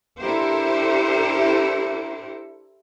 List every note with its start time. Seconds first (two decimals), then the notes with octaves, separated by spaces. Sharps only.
0.19 D4 E4 G4 A4 A#4 C5